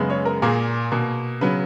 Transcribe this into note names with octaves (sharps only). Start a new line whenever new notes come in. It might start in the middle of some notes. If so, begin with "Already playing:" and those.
Already playing: F#2 C#3 G#3 B3
C#5
A#4
A#2 A#3 G#4
B2 A#3
C#3 F#3 B3 B4